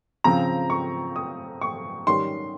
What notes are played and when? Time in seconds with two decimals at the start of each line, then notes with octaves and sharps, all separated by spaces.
0.24 C#3 F3 C4 A#5
0.70 C#6
1.16 D#6
1.61 C#6
2.07 D#3 G3 C#4 C6